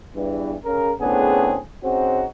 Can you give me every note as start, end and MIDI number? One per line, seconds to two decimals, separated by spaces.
0.15 0.54 40
0.15 0.54 43
0.15 0.54 52
0.65 0.92 49
0.65 0.92 70
1.00 1.57 45
1.00 1.57 49
1.00 1.57 59
1.00 1.57 60
1.00 1.57 62
1.00 1.57 68
1.83 2.25 49
1.83 2.25 60
1.83 2.25 61
1.83 2.25 63
1.83 2.25 66